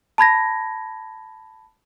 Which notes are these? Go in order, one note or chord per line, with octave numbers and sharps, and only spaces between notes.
A5 B5 G#6 A#6